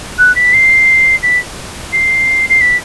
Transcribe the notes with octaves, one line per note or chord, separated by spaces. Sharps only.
F#6
B6
C7
B6
C7
C7
B6